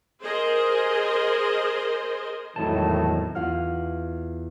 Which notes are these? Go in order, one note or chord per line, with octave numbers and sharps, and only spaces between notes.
G#4 A#4 C5 D#5
G#1 E2 A2 D#3 F#3 A5
E2 F4 F5 F#5 F6